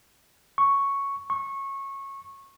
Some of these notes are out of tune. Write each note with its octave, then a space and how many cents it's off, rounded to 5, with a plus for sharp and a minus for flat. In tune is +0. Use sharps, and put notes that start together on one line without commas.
C#6 +0
C#6 -20